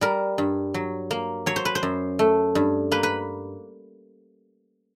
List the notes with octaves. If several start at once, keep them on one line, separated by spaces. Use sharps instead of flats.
G3 A#4
G2
F#3
A#3
F#3 C#5
C5
B4
C5
F#2
A3
G2
A#3 B4
B4